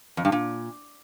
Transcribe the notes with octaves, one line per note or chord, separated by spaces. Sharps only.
F2
G2
A#2